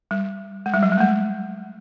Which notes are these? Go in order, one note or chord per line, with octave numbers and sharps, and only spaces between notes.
G3
G#3
G3
F#3
G3
A3
G#3